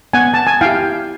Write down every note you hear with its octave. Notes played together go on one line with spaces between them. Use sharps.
B3 F#5 G#5
A5
G#5
E4 G4 F5 G5